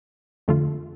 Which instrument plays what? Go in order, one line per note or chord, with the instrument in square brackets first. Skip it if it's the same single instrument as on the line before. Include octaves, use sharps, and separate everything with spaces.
[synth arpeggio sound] F2 D3 A3 F4